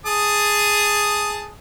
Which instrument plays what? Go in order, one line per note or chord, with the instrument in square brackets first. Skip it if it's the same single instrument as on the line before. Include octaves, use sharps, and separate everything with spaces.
[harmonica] G#4 A5 D#6